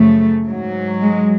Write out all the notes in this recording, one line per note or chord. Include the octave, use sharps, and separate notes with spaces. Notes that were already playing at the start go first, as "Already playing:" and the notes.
Already playing: F#2 C#3 F3 A3
G#2 F#3
G#3